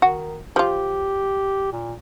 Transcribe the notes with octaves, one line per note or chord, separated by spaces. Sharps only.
D#3 F#4
F3 F4 G4
A#2